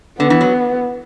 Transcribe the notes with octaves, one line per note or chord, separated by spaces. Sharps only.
D3 B3
E3
F#3